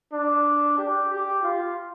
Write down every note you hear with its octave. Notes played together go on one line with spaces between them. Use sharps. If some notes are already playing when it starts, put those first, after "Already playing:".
D4
G4
G4
F4